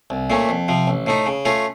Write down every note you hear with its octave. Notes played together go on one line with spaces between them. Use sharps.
C2
A#2 A3 C#4
F2
C3 F3
A1
A2 A3 D#4
C#3
A3 C#4 F4